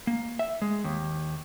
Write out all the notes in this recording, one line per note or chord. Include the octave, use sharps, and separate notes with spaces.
A#3
E5
G#3
D#2